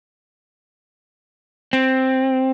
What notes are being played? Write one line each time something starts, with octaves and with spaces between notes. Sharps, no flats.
C4